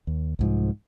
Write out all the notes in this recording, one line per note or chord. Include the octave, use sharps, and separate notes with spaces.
D#2
C2 G#2 F3